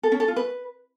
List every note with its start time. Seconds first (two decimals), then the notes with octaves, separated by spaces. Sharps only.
0.03 A4
0.12 C#4
0.20 A4
0.28 F4
0.36 B4